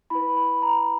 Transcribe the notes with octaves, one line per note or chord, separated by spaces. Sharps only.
E4 B4 B5
B5
A#5